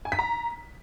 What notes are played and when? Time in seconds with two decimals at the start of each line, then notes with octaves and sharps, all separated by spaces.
0.05 G#5
0.12 B6
0.19 A#5